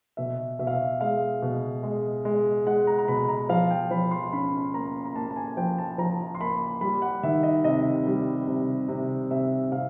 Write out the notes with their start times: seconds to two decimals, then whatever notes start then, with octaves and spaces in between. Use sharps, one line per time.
0.17 B2 E5
0.59 B2 E5
0.67 F5
0.76 E5
1.01 G#3 F5
1.42 B2
1.83 G#3
2.25 G#3
2.66 G#3 F#5
2.87 A#5
2.98 A#5
3.08 B2 B5
3.29 A#5
3.49 F3 F5
3.70 G5
3.91 F3 B5
4.11 C6
4.33 C#4 B5
4.74 A#3 A#5
5.06 A#5
5.16 A#3 A5
5.31 A5
5.37 G#5
5.57 F3 G5
5.78 A5
5.98 F3 A#5
6.35 C6
6.40 A#3 B5
6.81 G3 B5
7.02 F#5
7.23 D#3 E5
7.43 D#5
7.64 C3 D#5
8.07 G3
8.47 C3
8.89 C3
9.31 C3 E5
9.72 C3 F5